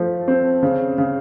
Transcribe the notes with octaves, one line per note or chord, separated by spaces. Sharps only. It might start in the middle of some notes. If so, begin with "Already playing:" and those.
Already playing: F3 A3
C4
C#3
C#3